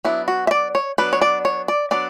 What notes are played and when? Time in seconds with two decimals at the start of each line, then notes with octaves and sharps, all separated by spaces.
0.05 F#3 B3 D4 E4
0.28 F#4
0.47 E5
0.51 D5
0.75 C#5
0.98 F#3 B3 D4 B4
1.13 C#5
1.21 D5
1.45 C#5
1.68 D5
1.91 F#3 B3 D4 D5